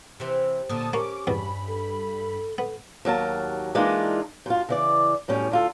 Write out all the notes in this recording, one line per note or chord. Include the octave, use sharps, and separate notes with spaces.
C3 E3 C4
A#2 D3 A#3 A5 D#6
A#3 C#4 G4 D6
E2 G2 B2 B5
A4
B3 A4
D#2 F#3 A#4 A5
E3 G#3 A#3 D4 D#4 F4
F#2 F4
C#3 E3 D5
F#2 A2 G3 C#4
D2 F4 A4